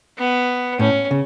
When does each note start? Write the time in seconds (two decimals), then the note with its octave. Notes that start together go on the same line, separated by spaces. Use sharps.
0.18 B3
0.79 A2 C#4
1.11 C#3